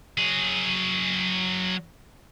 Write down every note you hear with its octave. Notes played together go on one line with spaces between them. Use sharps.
F#3 G#4